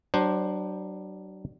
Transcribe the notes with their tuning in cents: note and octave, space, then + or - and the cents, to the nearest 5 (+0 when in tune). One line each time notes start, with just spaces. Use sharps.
F#3 +40 D4 +15 C5 +0